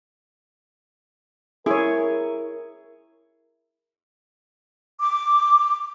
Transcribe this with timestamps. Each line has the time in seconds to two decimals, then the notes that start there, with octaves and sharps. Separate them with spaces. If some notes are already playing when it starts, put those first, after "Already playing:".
1.66 E4 G#4 A#4 C#5
5.01 D6